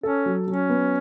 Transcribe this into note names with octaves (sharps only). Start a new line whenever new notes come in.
C#4 A4
F#3
F#3 C#4
B3